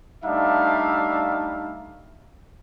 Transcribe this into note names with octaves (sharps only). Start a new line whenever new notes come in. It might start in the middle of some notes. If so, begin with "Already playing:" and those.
G3 A3 D4 D#4 E5 F5